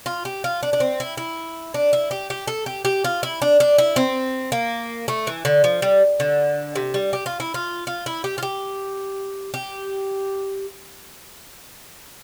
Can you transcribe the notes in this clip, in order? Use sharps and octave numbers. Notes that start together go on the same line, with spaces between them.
F4
G4
F4
D4
D4
C4
E4
E4
D4
E4
G4
G4
A4
G4
G4
F4
E4
D4
D4
E4
C4
A#3
A3
E3
D3
F3
G3
D3
C3
G3
G4
F4
E4
F4
F4
E4
G4
F4
G4
G4